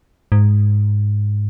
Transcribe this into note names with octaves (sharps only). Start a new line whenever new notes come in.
G#2